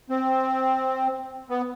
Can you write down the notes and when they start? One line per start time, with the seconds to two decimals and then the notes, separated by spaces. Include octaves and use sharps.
0.10 C4
1.50 B3